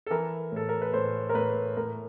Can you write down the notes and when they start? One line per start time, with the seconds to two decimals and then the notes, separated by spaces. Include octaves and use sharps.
0.06 A4
0.10 E3 A#4
0.52 A2 A4
0.69 A#4
0.82 B4
0.93 A2 C5
1.29 A#4
1.34 A2 B4
1.77 A2 A#4